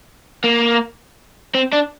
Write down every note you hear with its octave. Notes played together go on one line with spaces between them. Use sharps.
A#3
C4
D4